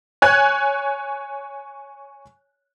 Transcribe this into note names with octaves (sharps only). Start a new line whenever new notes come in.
C#5 G#5 F#6 G#6